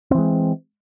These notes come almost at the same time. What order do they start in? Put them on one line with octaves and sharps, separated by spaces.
C4 E3 G#3